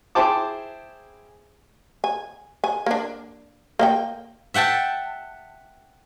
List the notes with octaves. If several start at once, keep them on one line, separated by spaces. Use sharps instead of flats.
E4 G#4 C5 G5 A5 D6
G#5
G#5
A#3 D4
A#3 D#5 G5
E5 F#5 G5 A5